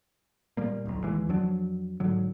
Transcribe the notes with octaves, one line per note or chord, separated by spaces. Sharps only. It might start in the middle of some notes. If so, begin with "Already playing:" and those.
A#2 G3 A#3
D1 B1
D#2 E3 G#3
F2 F3 F#3 D4
G#2 D3 F#3